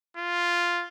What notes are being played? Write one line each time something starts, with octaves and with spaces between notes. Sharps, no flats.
F4